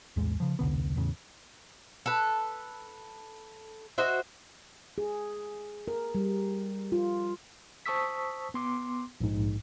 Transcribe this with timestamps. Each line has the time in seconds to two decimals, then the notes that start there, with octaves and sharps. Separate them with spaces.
0.16 B1 E2 A2 G#3
0.40 C#3 F3
0.59 E1 C2 D3 B3
0.96 E2 A2 C#3
2.06 A4 B4
3.98 F#4 C5 D#5 E5
4.98 G#4
5.88 A#4
6.15 G3
6.92 F4
7.86 C5 A5 C#6 D#6 E6 B6
8.54 B3 C6 D6
9.21 A#1 G#2